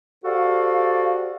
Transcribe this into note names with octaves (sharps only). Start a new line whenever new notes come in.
F#4 G4 A4 C5 D5 F5